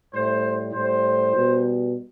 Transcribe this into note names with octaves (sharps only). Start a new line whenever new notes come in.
A2 G3 C5
A2 G3 C5
B2 G3